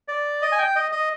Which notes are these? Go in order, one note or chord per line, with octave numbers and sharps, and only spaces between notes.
D5
D#5
G#5
G5
D#5
D#5